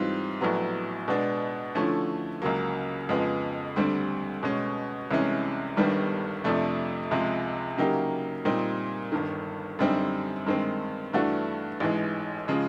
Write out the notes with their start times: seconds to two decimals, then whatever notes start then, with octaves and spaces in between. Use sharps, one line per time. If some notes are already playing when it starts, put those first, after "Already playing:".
Already playing: G#2 E3 G3 C4 F4
0.41 A#1 A2 F#3 B3
1.08 B2 G#3 B3 D4
1.75 D3 F3 A3 C#4 E4
2.42 C#2 C#3 F#3 A#3
3.09 F2 C#3 F3 G#3 B3
3.76 D2 D3 G3 C4
4.43 B2 G#3 C#4
5.11 C2 C3 E3 G#3 C#4
5.77 G1 G2 D#3 G3 B3
6.44 F2 C3 F3 A3 D4
7.11 C#2 C3 F3 G#3
7.78 C#3 F#3 A#3 D#4 G4
8.45 A#2 G3 C4 D#4
9.12 G1 G2 D#3
9.79 F#2 D3 G3 C4 D#4
10.46 G2 D#3 G#3 C4
11.13 G2 E3 A3 D4 F#4
11.80 A1 G#2 E3 G#3
12.48 C#3 F3 G#3